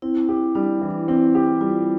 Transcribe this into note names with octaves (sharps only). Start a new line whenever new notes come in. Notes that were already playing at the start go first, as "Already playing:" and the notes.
C4 E4
G4
G3 D4
E3
C4 E4
G4
G3 F4